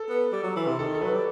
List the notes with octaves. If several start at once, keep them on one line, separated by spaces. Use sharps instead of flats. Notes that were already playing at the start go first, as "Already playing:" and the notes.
Already playing: A4
B3
G3
F#3
E3
C3
D#3 A4
A4
F#3 B4
G3